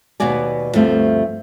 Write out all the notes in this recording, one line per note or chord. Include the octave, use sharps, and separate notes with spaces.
D#2 B2 B3 F#4 D5 G#5
D2 G2 F3 A3 C4